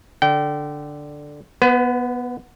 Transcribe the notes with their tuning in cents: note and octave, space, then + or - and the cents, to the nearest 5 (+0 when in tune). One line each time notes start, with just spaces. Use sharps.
D3 +0 G5 -30
B3 -10 B4 +35